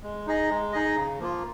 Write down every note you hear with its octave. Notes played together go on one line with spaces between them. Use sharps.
G#3
D#4 G#4 D#5
G#3
D#4 G#4 D#5
C#3
F3 A#3 F4